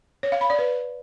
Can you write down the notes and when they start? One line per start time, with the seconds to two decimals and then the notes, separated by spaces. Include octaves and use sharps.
0.23 C#5
0.32 F5
0.41 B5
0.50 D5
0.59 B4